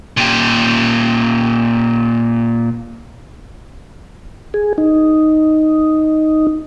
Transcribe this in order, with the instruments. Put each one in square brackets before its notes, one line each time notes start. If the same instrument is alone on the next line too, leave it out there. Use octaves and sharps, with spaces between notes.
[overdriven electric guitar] A#2 G4
[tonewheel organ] G#4
D#4